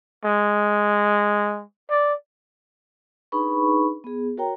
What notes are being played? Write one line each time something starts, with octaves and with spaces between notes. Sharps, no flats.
G#3
D5
D4 D#4 G#4 B4 B5 C#6
B3 G#4
F#4 A#4 C#5 G5 A#5